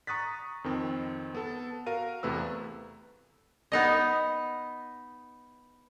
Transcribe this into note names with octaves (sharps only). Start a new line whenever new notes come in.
A#5 C#6 D#6 F#6 A6 B6
F2 D#3 C4
B3 A4 A5
F#4 A#4 F5 D#7
E2 C3 A3 B4 E6
B3 D#4 D#5